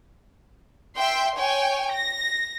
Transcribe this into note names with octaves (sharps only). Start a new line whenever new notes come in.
E5 G5 C6
C#5 G5 G#5
A#6